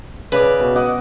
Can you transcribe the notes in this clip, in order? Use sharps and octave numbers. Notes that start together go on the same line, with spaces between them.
C#3 B4 D5
B2
D#5 F#5 D6